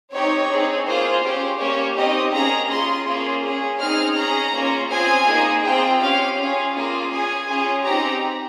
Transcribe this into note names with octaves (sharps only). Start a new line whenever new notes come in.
C4 D#4 G4 C#5
C4 D#4 G#4
A#3 F4 G#4 C5
C#4 G4 C5
A#3 C#4 G4 C#5
C4 D#4 G4 D#5
A#3 C#4 G#4 A#5
C#4 F4 G#4 C6
A#3 C#4 F4 G#4
C#4 G#4
C4 D#4 G#4 F6
C#4 G#4 A#5
A#3 C#4 F4
C4 F4 G#4 G#5
A#3 D#4 G#4
C4 F4 G#4 G5
C#4 G4 F5
C#4 F4 G#4
A#3 F4 G#4
C#4 G#4 G#5
C#4 F4 G#4
C4 D#4 G4 A#5